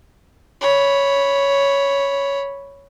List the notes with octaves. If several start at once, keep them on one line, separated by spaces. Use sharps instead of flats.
C#5 B5